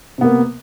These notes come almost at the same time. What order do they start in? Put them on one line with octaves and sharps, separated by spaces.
C3 B3 A#3